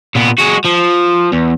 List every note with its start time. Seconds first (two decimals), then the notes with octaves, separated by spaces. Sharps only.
0.16 A#2 B3
0.39 G#3 F#4
0.65 F3
1.33 E2